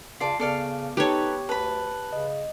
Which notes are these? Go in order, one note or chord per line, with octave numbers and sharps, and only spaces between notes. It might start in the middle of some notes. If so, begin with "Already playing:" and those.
C#3 F4 D5 A5 C7
C#3 B3 A4 D5 F5
D#4 G4 A4 B4 C#5
D2 B4 A5 B5
C#3 D#5